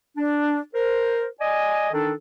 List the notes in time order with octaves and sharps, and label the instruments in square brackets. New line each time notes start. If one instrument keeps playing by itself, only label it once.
[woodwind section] D4
A#4 C5
D5 D#5 G#5
D#3 D4 D#4 A4